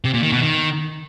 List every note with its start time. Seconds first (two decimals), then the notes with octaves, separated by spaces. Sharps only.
0.04 C3
0.14 A#2
0.23 D#3
0.32 B2
0.41 D#3